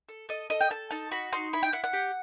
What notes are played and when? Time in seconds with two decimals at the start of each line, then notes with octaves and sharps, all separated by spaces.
0.09 A4
0.29 A4 D#5
0.50 A4 D#5
0.61 G5
0.70 A4 A5
0.91 D#4 A5
1.11 F#4 B5
1.32 D#4 C6
1.53 E4 B5
1.63 G5
1.73 E4 F#5
1.84 F#5
1.93 G4